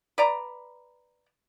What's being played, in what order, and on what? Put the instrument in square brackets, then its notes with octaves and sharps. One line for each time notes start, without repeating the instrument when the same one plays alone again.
[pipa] B4 D5 A#5